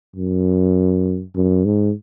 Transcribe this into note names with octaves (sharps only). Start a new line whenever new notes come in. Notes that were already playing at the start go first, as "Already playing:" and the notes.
F#2
F#2
G#2